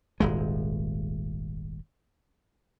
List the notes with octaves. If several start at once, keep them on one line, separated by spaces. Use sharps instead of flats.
D#1 G#1 G#3